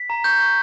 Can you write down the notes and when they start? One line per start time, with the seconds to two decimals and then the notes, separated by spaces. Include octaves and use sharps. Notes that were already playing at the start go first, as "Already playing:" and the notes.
Already playing: B6
0.10 A#5
0.24 C#6 G6
0.40 C#6